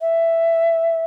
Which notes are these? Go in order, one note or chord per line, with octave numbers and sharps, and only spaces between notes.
E5